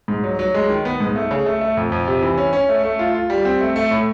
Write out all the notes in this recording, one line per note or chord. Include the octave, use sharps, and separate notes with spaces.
G#2
F#3
F#3
G#3
D#3
B3
G#2
A3
C#3
A3
A3
F2
F2
C3
E3
C#4
C#4
A3
A3
F4
F4
G3
C4
A3
A3
A2